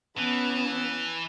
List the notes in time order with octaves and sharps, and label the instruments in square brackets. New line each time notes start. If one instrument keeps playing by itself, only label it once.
[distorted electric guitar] E3 [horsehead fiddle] B3 C#4 [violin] A5 B5